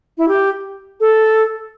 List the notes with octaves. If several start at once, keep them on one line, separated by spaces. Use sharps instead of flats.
E4
G4
A4